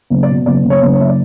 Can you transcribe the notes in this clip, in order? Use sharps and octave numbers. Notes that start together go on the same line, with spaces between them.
F#1
D5
B2
F#1 D5
F#1
C#5
F#1
C#5
F#1 E5
D5